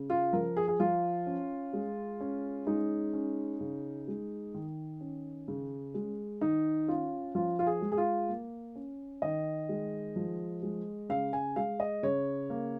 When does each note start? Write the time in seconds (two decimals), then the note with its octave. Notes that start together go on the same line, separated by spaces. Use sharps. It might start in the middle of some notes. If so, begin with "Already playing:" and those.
Already playing: C#3
0.10 F4
0.33 F3 A#4
0.56 G#4
0.68 G#4
0.80 F3 F4
1.26 C#4
1.73 G#3
2.21 C#4
2.67 G#3 D#4
3.13 C#4
3.61 C#3
4.08 G#3
4.54 D#3
5.01 C#4
5.48 C#3
5.94 G#3
6.41 D#3 D#4
6.88 C#4 F4
7.35 F3 F4
7.59 F4
7.67 G#4
7.82 G#3
7.92 G#4
7.98 F4
8.29 A#3
8.76 C#4
9.22 D#3 D#5
9.69 G#3
10.16 F3
10.63 G#3
11.09 C#3 F5
11.33 G#5
11.56 G#3 F5
11.80 D#5
12.03 C#3 C#5
12.50 A#3